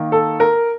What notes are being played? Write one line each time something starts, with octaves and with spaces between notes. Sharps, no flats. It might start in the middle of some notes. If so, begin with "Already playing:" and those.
Already playing: D#3 A#3
A4
A#4